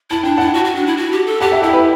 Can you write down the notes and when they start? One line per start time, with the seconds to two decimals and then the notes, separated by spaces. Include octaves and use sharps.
0.10 E4 A5
0.23 D4 G5
0.37 E4 F#5 A5
0.54 F#4
0.65 F#4
0.75 D4
0.87 E4
0.97 F#4
1.12 G4
1.26 A4
1.40 G4 F#5 A5
1.52 E5 G5
1.62 E4 E5 G5
1.73 G4 B4